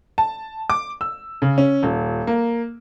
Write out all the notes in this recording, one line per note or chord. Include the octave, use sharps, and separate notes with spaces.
A5
D6
E6
C#3
C#4
D#1
A#3